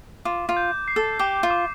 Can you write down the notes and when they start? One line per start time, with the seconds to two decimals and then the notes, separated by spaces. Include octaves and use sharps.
0.25 F4 D6
0.49 F4
0.57 G6
0.88 C7
0.96 A4
1.19 G4 D6
1.43 F4
1.51 D6